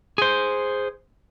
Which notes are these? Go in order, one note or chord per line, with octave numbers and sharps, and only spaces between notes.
G#4 C5